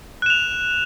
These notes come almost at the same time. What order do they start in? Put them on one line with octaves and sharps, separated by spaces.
F#6 E7 F7